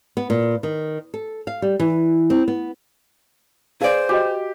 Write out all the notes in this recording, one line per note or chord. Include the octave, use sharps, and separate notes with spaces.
B3
A#2
D#3
A4
F5
G3
E3
C4
B3
G#4 B4 C5 D5 F5
F#4 G4 D#5